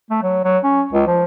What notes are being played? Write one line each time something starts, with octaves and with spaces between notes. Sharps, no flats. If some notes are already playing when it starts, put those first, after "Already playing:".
A3
F#3
F#3
C#4
C#2
F3